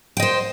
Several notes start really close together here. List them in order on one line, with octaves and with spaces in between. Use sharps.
G5 D#5 C5